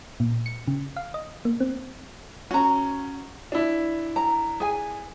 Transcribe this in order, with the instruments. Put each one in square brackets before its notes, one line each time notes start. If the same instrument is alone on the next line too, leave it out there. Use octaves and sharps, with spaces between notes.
[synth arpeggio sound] A#2
C#7
C#3
F5
D#5
A#3
C4
[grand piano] C#4 [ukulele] F#4 A#5
[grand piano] D4 E4
[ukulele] A#5
G#4 G#5